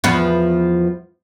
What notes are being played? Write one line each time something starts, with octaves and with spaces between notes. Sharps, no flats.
E2 F3 B3